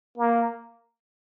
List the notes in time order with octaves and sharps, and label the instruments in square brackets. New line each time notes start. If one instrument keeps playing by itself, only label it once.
[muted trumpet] A#3